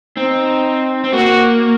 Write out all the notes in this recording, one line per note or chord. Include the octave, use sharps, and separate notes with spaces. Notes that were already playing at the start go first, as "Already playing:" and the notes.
C4 D#4
C4
A#3 F#4